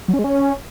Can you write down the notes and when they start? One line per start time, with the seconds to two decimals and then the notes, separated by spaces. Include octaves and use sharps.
0.08 F#3
0.14 C#4
0.19 G#3
0.24 C#4